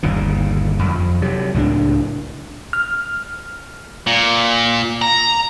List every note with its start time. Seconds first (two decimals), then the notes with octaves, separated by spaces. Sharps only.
0.03 G1 D#2 A#2
0.84 F2
1.22 C3 F#3
1.54 C#2 A2 A3 D4
2.73 F6
4.07 A#2
5.02 A#5